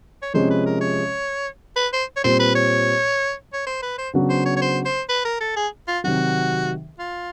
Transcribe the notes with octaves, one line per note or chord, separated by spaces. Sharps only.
C#5
C3 F3 G#3 C#4 C5
B4
A#4
C#5
B4
C5
C#5
A#2 G3 C4 C5
B4
C#5
C#5
C5
B4
C5
C#3 F#3 B3 D4 F#4
C5
C#5
C#5
C5
C5
B4
A#4
A4
G#4
F4
C3 D#3 F#3 F#4
F4